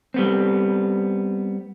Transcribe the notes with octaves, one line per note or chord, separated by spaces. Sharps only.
G3 B3 C4